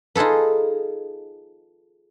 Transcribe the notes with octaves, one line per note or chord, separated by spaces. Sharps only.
D#4 F4 G#4 A4 B4